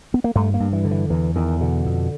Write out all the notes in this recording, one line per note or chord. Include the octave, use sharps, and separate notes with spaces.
B3
A#3
G2 A3
A#3
G2
E3
D3
E3
E2 E3
E2 D#3
B2 D3
F2